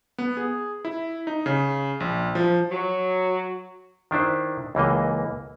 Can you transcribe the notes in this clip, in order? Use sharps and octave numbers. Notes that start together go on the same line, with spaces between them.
B3
G#4
E4
D#4
C#3
A#1
F3
F#3
D#3 D4 E4 C5
C#2 E3 A#3 D#5